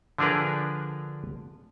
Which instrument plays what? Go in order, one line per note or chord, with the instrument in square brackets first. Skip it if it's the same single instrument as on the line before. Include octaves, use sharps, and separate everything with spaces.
[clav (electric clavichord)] D3 F3 D4 G#4 A#4 B4